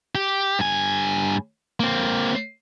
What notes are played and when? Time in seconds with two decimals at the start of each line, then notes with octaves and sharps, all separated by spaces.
0.15 G4
0.59 G2 G#5
1.80 A#3 C4